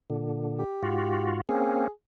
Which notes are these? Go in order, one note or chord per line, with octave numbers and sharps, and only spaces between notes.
A#2 D3
G4
G#2 F4 F#4
A#3 C4 C#4 G#4